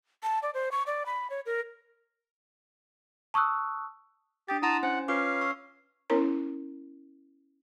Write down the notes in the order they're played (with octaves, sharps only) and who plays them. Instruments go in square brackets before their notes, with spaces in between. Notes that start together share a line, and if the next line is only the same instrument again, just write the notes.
[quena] A5
D5
C5
C#6
D5
B5
C#5
A#4
[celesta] A5 C#6 D#6 E6 F#6
[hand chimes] D4 D#6 A6 [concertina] G4
[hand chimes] E4 F#5 C6 [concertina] A5 A#5 D#6
[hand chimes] C#4 C5 G#5 [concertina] F#5
[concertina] C#4 F5 [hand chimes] F4 B4 D6
[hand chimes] C#6 E6
[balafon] B3 C#4 E4 A#4 C#5 A#5